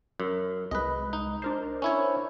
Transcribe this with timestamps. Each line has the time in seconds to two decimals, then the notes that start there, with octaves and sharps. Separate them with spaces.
0.20 F#2
0.71 C2 G#3 B4 D#5
1.13 D#4
1.42 D4 A#4 C5
1.82 C#4 E4 C#5